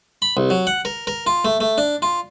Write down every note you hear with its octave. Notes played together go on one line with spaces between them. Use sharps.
B5
C2
F#3
F#5
A#4
A#4
F4
A3
A3
D4
F4